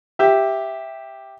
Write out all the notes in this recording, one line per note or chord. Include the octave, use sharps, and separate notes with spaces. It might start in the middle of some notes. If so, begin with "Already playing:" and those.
G4 E5